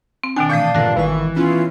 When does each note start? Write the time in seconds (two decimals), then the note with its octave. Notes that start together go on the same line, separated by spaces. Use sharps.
0.24 C4
0.36 B2 D#3 D4 G5 G#5
0.50 A#2 E3 A3 F5 G5 D#6
0.75 G2 A#2 D3 D4 F#6 A#6
0.96 G#1 D#3 E3 C#6
1.36 B3 C#4 E4 F4